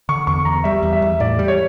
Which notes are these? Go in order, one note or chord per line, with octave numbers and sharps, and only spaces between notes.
D3 C#6
E2 C#6
E2 A#5
G3 E5
E2
E5
E2
A2 D5
G3
C#5